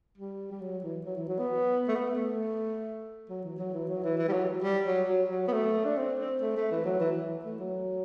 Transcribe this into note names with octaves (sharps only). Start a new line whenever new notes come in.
G3
G3
F#3
E3
F#3
E3
F#3
B3
A3
B3
A3
F#3
E3
F#3
E3
F#3
E3
E3
G3
F#3
G3
F#3
F#3
F#3
B3
A3
D4
C4
C4
A3
A3
E3
F#3
E3
E3
A3
F#3